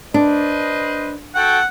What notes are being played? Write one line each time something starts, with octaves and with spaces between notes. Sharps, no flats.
D4 B4 C5 D#5
F#4 A4 F#5 G5